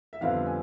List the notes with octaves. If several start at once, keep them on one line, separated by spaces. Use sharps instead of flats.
E5
F2 D3 G3 B3 D4 F5
G#5